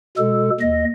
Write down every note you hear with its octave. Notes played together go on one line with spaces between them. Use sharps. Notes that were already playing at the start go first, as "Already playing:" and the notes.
B2 G#3 A4
D#2 D#5